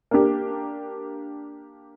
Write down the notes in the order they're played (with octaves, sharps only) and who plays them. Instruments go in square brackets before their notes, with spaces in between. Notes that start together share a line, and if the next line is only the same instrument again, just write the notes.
[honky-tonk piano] A#3 D4 G4